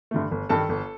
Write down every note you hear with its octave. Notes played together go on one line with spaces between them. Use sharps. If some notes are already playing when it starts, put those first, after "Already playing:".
G2 D3 A3
G1
G2 D#3 A4 A5
G1